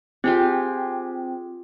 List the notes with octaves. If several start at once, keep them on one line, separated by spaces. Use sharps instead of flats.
C4 F4 G4 G#4